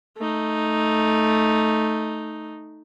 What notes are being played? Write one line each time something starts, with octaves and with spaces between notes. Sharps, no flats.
A3 D#4